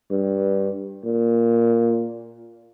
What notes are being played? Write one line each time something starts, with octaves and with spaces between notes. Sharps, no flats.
G2
A#2